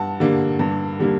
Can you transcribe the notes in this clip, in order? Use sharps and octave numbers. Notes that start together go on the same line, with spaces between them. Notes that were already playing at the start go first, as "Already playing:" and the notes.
Already playing: G2 F#5 A5
D3 G3 A#3 D4
G2
D3 G3 A#3 D4